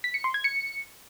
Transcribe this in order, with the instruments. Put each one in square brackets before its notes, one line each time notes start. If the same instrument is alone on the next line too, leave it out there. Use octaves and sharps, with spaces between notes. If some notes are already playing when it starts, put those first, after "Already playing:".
[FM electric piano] B6
C#7
C6
G#6
C#7